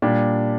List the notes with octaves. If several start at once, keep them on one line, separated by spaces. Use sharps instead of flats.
A#2 G3 D4 G4